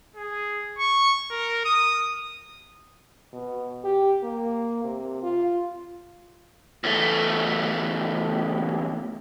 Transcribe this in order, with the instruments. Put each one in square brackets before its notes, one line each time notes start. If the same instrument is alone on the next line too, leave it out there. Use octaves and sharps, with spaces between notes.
[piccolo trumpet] G#4
C#6
A#4
D#6
[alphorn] B2
G4
A#3
C3
F4
[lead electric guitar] E2 A3